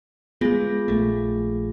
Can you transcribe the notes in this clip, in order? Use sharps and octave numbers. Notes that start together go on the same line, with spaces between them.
G#3 B3 F4 G#4 A#6
A#1 A3